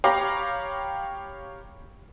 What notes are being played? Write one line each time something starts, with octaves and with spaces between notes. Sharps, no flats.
G4 C#5 F5 A#5 B5 D6